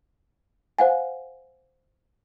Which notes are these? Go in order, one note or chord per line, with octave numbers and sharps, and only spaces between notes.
C5 F5 F#5 G#5